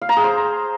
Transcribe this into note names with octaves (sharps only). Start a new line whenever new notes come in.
F5
A#5
G#4
C5